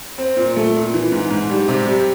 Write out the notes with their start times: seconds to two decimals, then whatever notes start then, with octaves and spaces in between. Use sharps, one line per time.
0.18 C4
0.37 A#2
0.56 A3
0.74 A#2
0.94 E3
1.12 G#2
1.31 G#2
1.50 G3
1.68 C3
1.87 G3